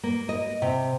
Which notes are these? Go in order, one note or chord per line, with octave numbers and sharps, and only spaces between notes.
A#3
D#5
C3